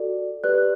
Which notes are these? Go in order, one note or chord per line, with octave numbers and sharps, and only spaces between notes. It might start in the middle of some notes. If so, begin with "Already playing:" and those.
Already playing: F#4 A4 D5
G4 B4 D5 F#6